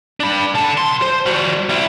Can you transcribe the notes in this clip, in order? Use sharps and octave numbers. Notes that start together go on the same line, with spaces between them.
D4 B5
D3 A5
B1 C6
C5
G3 F#4
G3 E4